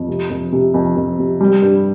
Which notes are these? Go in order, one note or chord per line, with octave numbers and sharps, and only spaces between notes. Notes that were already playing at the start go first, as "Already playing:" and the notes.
Already playing: F2
C3
F2
C3
F2
F2
C3
G3
G2